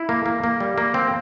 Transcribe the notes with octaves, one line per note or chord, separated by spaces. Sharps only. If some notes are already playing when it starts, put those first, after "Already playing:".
Already playing: E4
A#3
A#3
A#3
G3
A#3
C4